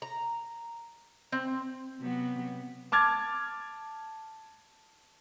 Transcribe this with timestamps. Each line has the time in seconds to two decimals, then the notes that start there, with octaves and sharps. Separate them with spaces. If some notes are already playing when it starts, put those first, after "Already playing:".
0.02 A#5
1.32 C4
2.00 C3 F#3 B3
2.92 A5 D6 F6 G#6 A6